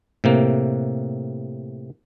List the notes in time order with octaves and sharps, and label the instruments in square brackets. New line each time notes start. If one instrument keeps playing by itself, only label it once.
[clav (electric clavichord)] A2 C3 A#3